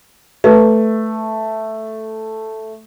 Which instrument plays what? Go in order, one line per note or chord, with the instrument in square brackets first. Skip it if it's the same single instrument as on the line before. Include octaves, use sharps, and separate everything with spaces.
[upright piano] A3 [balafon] B4